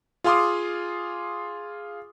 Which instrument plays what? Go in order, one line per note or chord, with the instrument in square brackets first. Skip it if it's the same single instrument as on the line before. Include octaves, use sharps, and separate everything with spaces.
[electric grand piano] F4 G#4 F5 C6 D6 D#6